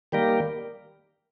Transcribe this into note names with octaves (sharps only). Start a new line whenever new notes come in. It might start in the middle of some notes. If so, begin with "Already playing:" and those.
D#3 G3 A#3 G4 A#4